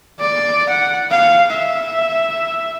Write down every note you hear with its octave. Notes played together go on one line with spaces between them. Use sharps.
D5
F#5
F5
E5